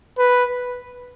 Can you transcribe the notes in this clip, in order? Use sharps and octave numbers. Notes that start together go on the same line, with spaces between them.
B4